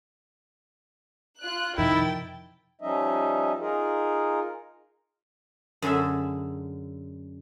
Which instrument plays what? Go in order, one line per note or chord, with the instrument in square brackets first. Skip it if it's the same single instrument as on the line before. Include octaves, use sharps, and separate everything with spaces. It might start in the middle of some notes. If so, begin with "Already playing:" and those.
[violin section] F4 F#6
[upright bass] F2 C3 [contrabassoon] D#3 [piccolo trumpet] E4 [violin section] G5 A6
[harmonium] F3 G3 C#4 D#4 D#5 E5
D#4 F4 G#4 A#4
[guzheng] F#2 D3 G#4 A4 E5